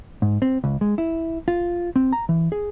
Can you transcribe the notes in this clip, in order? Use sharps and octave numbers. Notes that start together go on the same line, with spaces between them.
G#2
C4
C#2
G#3
E4
F4
C4
A#5
E3
G#4